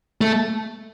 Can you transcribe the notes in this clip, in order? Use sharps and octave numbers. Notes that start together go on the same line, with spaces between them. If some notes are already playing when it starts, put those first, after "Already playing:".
A3